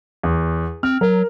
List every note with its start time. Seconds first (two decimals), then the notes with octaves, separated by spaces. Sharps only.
0.23 E2
0.83 C4 F6
1.01 F#3 A#4